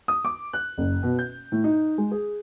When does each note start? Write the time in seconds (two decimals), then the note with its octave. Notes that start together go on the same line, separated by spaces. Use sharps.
0.08 D#6
0.25 D6
0.53 F#6
0.78 F#1
1.03 B2
1.19 G6
1.52 A2
1.64 D#4
1.98 G#3
2.11 G#4